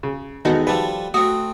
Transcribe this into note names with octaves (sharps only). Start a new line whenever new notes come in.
C#3
E2 D#3 G#3 B3 D#4 F#4 A4
F3 G3 A4 B4 A5
A3 C4 F#4 D#6